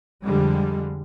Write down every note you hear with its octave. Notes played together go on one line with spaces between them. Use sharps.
F2 D3 G3 G#3